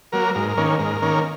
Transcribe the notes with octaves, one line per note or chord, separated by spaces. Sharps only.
F#3 A#3 A#4
G#2 A#4
A#4
D#3 A#3 C#4
G#2 A#4
D#3 A#3 C#4